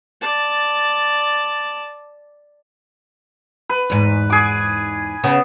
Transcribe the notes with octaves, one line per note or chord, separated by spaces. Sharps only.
D5 A5
B4
E2 G#2
G#4 D6
C#3 B3 C#4